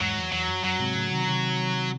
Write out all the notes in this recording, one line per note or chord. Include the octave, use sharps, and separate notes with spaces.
E2 G#2 F#3
E2
E2 F#3
F#2
F#2 F#3
G#2 C3
A2 C#3
C3 D#3
C3 D#3